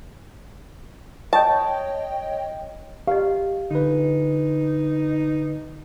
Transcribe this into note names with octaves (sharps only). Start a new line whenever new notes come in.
C#5 D#5 G5 A5
G4 D#5 F5
D3 D#4 B4